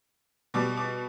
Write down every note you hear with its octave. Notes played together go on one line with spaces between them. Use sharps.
B2 G3 D6
D6